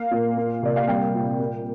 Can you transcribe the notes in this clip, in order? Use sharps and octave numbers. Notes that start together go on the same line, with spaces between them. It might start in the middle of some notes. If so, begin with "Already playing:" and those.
Already playing: A#3 F5
A#2
A#3
C3 D5
F5
G3 G5
A#2
A#3